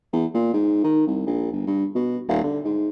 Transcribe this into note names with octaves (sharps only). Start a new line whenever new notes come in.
E2
A#2
G#2
D#3
C2
A#1
G1
G2
B2
D#1
D3
G#2